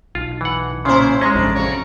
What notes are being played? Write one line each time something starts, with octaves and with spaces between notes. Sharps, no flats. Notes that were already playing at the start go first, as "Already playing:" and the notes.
B1 F4
E3 F#5
A#2 C#3 C#4 E4 C5 C6
G#3 C#4 C#5 A#5
A1 F2 C3 D4
C#3 F#4 C#5